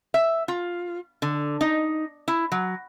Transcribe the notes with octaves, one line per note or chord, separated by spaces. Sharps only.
E5
F4
D3
D#4
E4
F#3